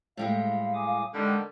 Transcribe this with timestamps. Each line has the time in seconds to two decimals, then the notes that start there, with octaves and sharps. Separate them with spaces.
0.17 A2 G3 G#3 F5
0.74 G#5 D6 D#6
1.14 D3 D#3 G3 G#3